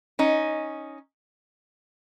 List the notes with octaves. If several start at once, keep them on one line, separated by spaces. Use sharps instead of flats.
C#4 D#4